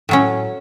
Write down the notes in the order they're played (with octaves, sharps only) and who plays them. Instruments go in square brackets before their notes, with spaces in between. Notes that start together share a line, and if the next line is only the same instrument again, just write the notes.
[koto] A2 F#3 C#4